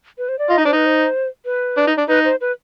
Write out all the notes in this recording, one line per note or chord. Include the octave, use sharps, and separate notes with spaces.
B4
C5
D5
F4 D#5
D#4
D4 C5
D#4 B4
C5
B4
D4
D#4
D4
D#4 B4
C5
B4